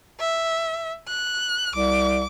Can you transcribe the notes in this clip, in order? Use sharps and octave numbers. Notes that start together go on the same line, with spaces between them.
E5
F#6
C2 D6